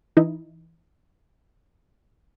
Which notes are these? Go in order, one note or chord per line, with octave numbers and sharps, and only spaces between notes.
E3 D#4 E4 D#5